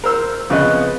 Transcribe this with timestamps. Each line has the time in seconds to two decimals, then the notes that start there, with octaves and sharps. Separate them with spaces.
0.04 A#4 C5 E6
0.50 F2 C#3 B3 B4 D#5 F#6